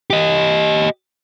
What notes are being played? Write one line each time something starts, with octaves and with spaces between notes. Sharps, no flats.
G4 D#5